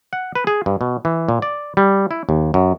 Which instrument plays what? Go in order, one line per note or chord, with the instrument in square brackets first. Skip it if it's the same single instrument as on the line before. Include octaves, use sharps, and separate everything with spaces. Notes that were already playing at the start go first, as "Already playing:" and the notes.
[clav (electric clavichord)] F#5
B4
G#4
G2
B2
E3
A#2
D5
G3
E4
D#2
F#2